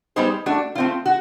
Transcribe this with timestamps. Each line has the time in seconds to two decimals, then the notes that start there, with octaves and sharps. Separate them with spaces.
0.16 G3 B3 D#4 G#4 C5
0.46 A3 D4 F#4
0.75 A3 C4 F4
1.06 F#4